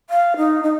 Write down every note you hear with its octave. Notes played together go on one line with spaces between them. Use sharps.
F5
D#4
D#4